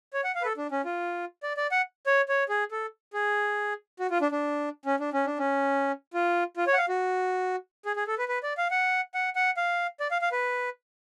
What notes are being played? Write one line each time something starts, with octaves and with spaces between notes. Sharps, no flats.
C#5
F#5
F5
B4
A4
D4
C#4
F4
D5
D5
F#5
C#5
C#5
G#4
A4
G#4
F#4
F4
D4
D4
C#4
D4
C#4
D4
C#4
F4
F4
C#5
F#5
F5
F#4
G#4
G#4
A4
B4
B4
D5
F5
F#5
F#5
F#5
F5
D5
F5
F5
B4